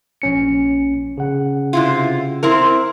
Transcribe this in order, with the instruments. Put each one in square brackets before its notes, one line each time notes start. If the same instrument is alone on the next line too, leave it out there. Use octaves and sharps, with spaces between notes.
[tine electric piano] A#1 C#4 C#7
C#3 F#5
[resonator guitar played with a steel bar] C3 E4 F4
C4 E4 A#4